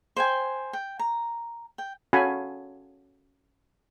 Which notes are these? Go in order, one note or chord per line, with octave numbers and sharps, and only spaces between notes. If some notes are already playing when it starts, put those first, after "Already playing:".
C5 G5 G#5
G5
A#5
G5
C#4 F#4 A4 F5 G#5 B5